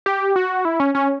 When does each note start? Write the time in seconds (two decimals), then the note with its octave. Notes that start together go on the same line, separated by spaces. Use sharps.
0.06 G4
0.36 F#4
0.65 E4
0.80 C#4
0.95 C#4